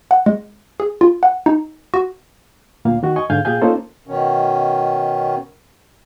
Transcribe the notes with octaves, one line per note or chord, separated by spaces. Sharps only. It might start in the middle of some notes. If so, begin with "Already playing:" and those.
F#5
G#3
G#4
F4
F#5
D#4
F#4
D2 A#2 A#3 F5
D#3 F#4
D#5 G#5 C#6
G#2 D3 F5 G#5 G6
A#2 G4 G#4 F5 G#5 G6
A#3 C#4 D#4 F4 A4 C5
B2 D#3 C#4